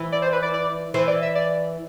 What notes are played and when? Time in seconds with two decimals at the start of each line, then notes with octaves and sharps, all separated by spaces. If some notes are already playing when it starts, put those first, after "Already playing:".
Already playing: E3
0.12 D5
0.22 C5
0.32 B4
0.42 D5
0.54 D5
0.94 E3 C5
1.07 D5
1.22 E5
1.35 D5